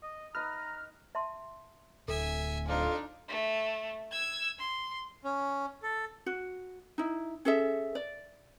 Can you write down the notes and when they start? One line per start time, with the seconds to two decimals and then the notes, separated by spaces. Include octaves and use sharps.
0.03 D#5
0.35 D#4 B4 A#5 F6
1.15 E5 A5 C6
2.08 D1 A4 E5 G#5
2.68 F2 D4 D#4 F4
3.29 A3
4.12 E6 G#6
4.59 C6
5.24 C#4
5.83 A4
6.26 F#4
6.98 D#4 E4
7.45 C#4 G#4 A4 E5
7.95 D5